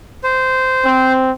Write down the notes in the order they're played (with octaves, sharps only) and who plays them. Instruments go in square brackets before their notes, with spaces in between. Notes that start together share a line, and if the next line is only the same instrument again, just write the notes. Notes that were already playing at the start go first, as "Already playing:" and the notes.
[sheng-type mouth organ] C5
[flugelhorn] C4